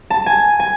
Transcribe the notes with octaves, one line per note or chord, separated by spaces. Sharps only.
A5
G#5
G#5